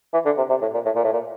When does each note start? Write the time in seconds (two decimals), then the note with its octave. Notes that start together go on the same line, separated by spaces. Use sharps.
0.13 E3
0.25 D3
0.37 C3
0.49 C3
0.61 A2
0.74 A#2
0.85 A2
0.95 A#2
1.04 A2
1.13 A#2